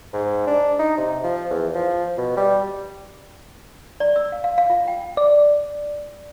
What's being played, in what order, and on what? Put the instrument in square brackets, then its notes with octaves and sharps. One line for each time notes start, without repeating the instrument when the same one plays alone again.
[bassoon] G#2
D4
D#4
C3
F3
E2
F3
B2
G3
[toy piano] D5
E6
F5
F5
F5
F4
G5
[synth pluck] D5